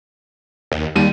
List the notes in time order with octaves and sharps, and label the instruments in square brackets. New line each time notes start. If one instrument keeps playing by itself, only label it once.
[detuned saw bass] D#2
[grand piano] D#2 D#7 [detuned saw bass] G3